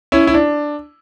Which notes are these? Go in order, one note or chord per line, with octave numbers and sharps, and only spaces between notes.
C#4 E4
E4
D4